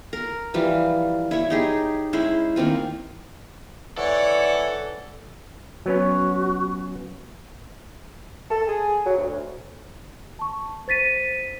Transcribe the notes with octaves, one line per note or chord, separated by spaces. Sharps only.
A#4
E3 F3 G3 F4
E4 C#5
D#4 G4 G#4
G#3 C#4 E4 C5
D#3 A#3 C4 F4
E3 A4 C#5 D5 F#5
F#3 B3 C#4 F#4
A4
G#4
F#3
D2
A5 C#6
C5 A6 B6 D#7